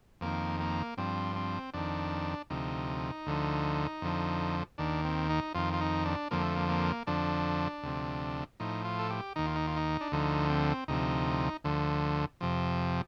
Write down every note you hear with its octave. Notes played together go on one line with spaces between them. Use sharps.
F2 D#3 A#3
A#3
G2 F3 C4
C4
F2 D#3 D4
D2 C3 F3 D#4
D2 D3 F3
F2 D3 F3
D#2 D#3 D4
C4
D#4
F2 D#3 F4
F4
D#4
D4
F2 D3 F3 A#3
A3
A#3
A#3
F2 D3 F3 D4
D2 C3 F3
A2 F3 D#4
F4
A4
G4
D#2 D#3 D#4
F4
D#4
F4
D#4
D4
D2 D3 F3 D#4
C4
D2 C3 F3 D#4
D2 D3 F3
F2 C3 F3